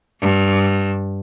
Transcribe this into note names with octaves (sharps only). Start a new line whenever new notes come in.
G2